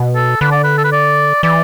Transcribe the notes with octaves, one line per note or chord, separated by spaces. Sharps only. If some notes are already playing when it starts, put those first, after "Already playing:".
Already playing: B2
A4
D3 B4
D5
B4
A4
B4
D5
E3 D5